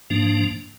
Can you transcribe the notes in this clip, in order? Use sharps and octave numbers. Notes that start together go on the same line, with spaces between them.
G#2 F3 A#3 D4